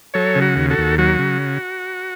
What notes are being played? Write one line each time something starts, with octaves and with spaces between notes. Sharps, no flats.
F#3 A4 C#5
C#3
F#4
D#2
F#4 A4
D#2
F#3 F#4
C#3